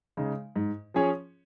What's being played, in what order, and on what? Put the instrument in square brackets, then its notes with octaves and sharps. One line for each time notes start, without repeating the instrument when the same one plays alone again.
[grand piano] C#3 G#3 D#4
G#2
F3 C#4 G#4 C#5